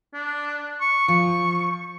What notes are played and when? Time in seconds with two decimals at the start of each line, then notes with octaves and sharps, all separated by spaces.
0.14 D4
0.80 C#6
1.08 F3 C#6